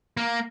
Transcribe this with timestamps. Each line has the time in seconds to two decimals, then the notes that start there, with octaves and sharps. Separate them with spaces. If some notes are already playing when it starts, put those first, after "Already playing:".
0.17 A#3